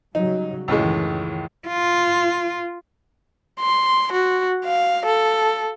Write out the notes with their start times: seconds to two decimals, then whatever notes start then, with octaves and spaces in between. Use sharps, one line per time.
0.15 C#3 F#3 G3 D#4
0.68 C#2 F#2 A2 D#3 E3 G#3
1.67 F4
3.60 C6
4.12 F#4
4.65 F5
5.06 A4